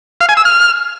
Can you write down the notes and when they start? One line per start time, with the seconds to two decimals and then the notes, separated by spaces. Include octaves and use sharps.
0.21 F5
0.29 G#5
0.37 E6
0.45 F6